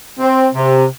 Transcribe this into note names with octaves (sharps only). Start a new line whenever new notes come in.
C4
C3